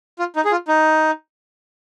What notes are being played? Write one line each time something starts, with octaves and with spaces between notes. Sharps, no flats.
F4
D#4
G#4
F4
D#4